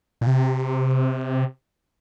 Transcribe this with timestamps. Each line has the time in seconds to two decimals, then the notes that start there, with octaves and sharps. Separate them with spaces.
0.21 A#2
0.27 C3